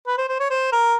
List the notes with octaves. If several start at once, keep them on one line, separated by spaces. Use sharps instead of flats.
B4
C5
C5
C#5
C5
A#4